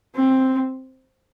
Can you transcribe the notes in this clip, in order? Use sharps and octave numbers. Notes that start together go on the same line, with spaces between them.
C4